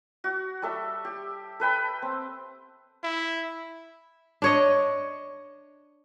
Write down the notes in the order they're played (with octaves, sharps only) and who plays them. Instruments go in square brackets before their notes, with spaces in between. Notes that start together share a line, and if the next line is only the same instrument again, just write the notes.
[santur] F#4
G3 A4 E5
G4
A4 B4 G5 B5
C4
[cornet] E4
[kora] D4 C#5 D#5